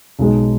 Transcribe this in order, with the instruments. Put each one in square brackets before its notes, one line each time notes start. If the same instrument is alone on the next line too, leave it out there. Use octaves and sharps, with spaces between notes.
[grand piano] B1 B2 G#3